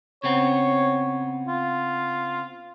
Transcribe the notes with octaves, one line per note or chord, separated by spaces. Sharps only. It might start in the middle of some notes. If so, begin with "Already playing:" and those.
C#3 B3 C4 C#5
F4